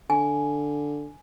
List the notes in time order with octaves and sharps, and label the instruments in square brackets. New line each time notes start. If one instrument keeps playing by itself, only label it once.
[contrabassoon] D3 [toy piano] G#5